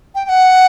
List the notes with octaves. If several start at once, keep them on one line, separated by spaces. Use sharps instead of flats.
G5
G5
F#5